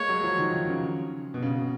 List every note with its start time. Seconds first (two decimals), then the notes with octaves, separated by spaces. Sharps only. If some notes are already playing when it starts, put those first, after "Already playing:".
Already playing: G#3 A#3 C#5
0.09 F#3
0.23 F3
0.38 D#3
0.53 D#3
0.67 C#3
1.34 B2
1.42 C#3